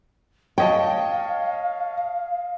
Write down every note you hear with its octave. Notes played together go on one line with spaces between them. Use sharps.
C#5 D#5 F5 G5 A5